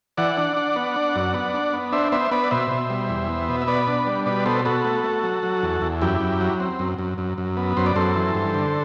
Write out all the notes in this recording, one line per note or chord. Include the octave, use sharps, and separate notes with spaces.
E3 D5 F#5
D4
D4
B3
D4
F#2
B3
D4
B3
D4 C5 E5
B3 C5 E5
B3 B4 D5
D5
B2 C5 E5
B2
G3
E2
B3
B2
E5
B3 B4 D5
D4
G3
B2 B4 D5
B3 A4 C5
B3 F#4 A4
A3
A3
F#3
F#3
E2
E2
F#2 E4 G4
F#2
F#3
C4
F#2
F#2
F#2
F#2
B3
F#2 C5
D5
F#2 A4 C5
E3
G2
D3